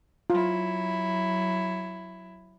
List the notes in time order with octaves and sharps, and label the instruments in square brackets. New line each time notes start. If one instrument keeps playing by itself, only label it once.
[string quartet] F#3 E4 [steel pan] F4